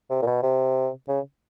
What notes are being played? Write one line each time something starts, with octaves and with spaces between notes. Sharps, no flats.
C3
A#2
B2
C3
C#3